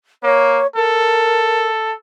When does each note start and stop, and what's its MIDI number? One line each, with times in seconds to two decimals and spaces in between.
0.23 0.62 58
0.23 0.67 73
0.76 1.94 69
0.76 1.68 70